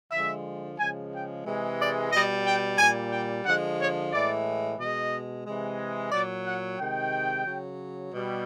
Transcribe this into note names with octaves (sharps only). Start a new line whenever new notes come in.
D3 F3 G#3 E5
C#3 F3 G#3 G#5
G5
C3 E3 G#3
D5
B2 G3 D#5
G5
A#2 G3 G#5
G5
D3 F3 G#3 F#5
C#5
A2 E3 G#3 D5
B2 G#3 D#5
C3 E3 G#3
A#2 F#3 D5
F#5
C3 D#3 G#3 G5
C#3 F#3
B2 G3